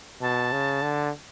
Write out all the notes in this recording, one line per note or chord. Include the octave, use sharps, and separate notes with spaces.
B2 A5
C#3
D3